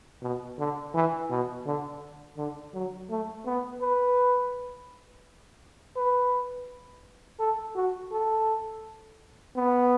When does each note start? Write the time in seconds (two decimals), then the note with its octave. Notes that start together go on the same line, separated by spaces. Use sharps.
0.23 B2
0.59 D3
0.94 E3
1.30 B2
1.66 D3
2.38 D3
2.74 F#3
3.10 A3
3.46 B3
3.82 B4
5.97 B4
7.40 A4
7.76 F#4
8.12 A4
9.56 B3